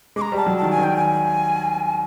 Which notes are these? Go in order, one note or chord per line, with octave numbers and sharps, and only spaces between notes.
G#3 D6
A#5
G3 A5
F#3
D#3 A5
G#5
D#3
G5
G#5